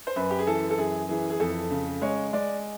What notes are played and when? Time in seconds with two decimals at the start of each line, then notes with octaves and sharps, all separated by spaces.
0.07 C5
0.16 F#2 B4
0.31 G4
0.39 G#4
0.47 E3 A4
0.70 A4
0.78 F#2 G#4
1.09 E3 G#4
1.30 G#4
1.39 F2 A4
1.70 C#3
2.01 G#3 C#5
2.33 G#3 D5